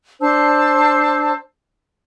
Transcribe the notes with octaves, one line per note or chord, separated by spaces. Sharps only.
D4 C5 A5 E6